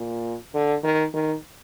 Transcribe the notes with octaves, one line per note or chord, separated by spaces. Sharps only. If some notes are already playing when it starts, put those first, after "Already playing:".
Already playing: A#2
D3
D#3
D#3